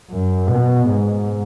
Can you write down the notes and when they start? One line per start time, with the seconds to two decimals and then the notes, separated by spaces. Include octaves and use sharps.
0.11 F#2
0.49 B2
0.89 G#2